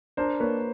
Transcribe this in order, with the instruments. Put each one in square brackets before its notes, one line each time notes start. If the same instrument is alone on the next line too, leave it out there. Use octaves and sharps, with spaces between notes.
[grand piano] D4 [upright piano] A#4 C5
[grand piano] A#3 [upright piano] B4 C#5